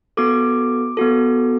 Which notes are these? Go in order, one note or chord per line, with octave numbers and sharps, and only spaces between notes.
B3 F#4 A4 D6
B3 F#4 A4